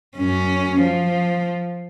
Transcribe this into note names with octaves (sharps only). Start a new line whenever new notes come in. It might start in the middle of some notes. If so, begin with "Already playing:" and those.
F#2 C#4
F3